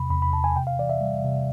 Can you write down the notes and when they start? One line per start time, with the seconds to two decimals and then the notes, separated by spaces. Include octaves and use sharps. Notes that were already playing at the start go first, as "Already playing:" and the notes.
Already playing: E2 C3 B5
0.10 E2 B5
0.22 B5
0.33 C3 A5
0.44 G#5
0.56 C3 G5
0.67 F5
0.79 E3 D5
0.90 E5
1.01 G3
1.24 C3